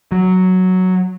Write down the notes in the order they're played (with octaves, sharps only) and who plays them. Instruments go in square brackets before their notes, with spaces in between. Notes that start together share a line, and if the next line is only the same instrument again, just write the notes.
[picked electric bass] F#3